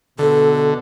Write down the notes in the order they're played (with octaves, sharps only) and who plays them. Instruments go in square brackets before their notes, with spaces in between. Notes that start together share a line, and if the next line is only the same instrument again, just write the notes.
[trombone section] B2 [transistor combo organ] D3 [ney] A4